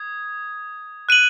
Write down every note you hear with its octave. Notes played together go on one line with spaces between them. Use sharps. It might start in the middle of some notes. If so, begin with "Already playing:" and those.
Already playing: D#6 G#6
F#6 D#7 F#7